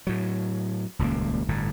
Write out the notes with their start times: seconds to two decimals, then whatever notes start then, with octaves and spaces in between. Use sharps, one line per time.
0.07 A2 F#3
0.99 D#1 C#2 B2 A#3
1.48 G1 A2